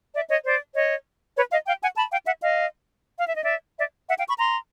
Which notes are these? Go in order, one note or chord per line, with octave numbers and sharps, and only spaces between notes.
D5 E5
C#5 D#5
C5 D5
C#5 D#5
B4 C#5
D#5 F5
F5 G5
F#5 G#5
A5 B5
F5 G5
E5 F#5
D#5 F5
F5
E5
D#5
D5 E5
D5 E5
E5 F#5
F5 G5
B5 C#6
A#5 C6